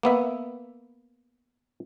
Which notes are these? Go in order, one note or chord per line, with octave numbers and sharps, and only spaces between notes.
A#3 B3 E5